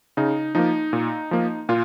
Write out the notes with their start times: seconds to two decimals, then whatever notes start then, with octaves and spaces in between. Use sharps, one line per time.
0.17 C#3 D#4
0.55 F3 A#3 D#4
0.93 A#2
1.31 F3 A#3
1.69 A#2 F4